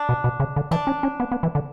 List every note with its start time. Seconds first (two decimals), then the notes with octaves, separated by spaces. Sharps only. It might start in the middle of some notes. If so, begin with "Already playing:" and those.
Already playing: D4
0.09 B2
0.24 B2
0.40 C#3
0.56 D3
0.71 E3 D4
0.87 C#4
1.03 C#4
1.20 B3
1.32 B3
1.43 E3
1.55 D3